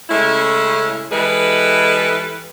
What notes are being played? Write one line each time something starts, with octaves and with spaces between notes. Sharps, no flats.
C#3 G#3 A3 C#4 E4
E3 G3 G#3 E4 A4 B4